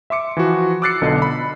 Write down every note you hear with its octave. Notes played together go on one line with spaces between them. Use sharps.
E5 C6 D6 C#7
E3 F3 F#4
D6 E6 F#6 A6 C7 C#7
B1 D3 B3 F4 A4 D#5
B5